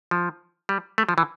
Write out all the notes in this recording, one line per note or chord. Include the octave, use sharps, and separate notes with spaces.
F3
G3
A3
F3
E3